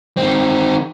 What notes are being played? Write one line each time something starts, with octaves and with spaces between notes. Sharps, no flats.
D#3 C4